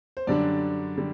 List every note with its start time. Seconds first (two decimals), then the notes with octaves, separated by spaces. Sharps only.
0.17 C5
0.27 F#2 D3 G3 D4 D5
0.98 D3 G3